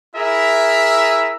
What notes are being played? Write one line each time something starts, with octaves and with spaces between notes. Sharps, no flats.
E4 G#4 A#4 E5